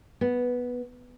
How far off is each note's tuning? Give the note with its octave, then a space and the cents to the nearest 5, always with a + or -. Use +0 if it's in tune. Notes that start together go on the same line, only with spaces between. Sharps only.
B3 -5